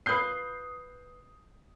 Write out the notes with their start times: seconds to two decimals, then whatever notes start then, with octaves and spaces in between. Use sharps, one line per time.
0.06 F4 B4 D#6 G6 C7